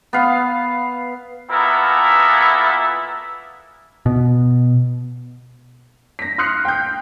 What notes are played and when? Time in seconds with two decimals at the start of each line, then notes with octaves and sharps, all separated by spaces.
0.13 B3 F5
1.49 A#2 B3 E4 A4 A#4
4.06 B2
6.19 A#6 B6
6.38 C6 D#6 F6 F#6 C7 C#7
6.65 G5 G6